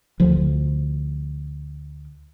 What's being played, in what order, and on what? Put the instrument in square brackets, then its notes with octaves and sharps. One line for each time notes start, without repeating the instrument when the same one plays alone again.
[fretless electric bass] D2 F3